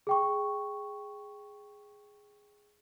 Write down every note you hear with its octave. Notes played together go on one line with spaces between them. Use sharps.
G#4 G5 C#6